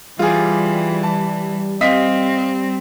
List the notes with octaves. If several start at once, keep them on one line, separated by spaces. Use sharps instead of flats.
E3 G3 F4 G#4
A5
C4 D#5 F5 B6